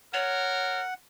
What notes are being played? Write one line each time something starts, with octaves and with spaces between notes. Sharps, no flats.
A#4 C#5 F#5